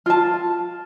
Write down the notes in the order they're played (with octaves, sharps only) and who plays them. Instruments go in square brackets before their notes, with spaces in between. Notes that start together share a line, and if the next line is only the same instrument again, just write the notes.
[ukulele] F4 A5